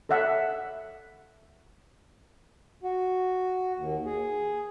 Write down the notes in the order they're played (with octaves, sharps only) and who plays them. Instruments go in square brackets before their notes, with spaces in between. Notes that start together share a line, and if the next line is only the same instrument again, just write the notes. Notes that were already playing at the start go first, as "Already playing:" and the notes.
[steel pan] A4 C#5 E5 F#5
[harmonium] F#4
D#2
G#4